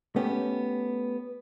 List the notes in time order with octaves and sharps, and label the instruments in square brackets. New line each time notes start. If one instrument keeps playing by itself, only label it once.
[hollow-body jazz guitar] A3 B3 C#4 G4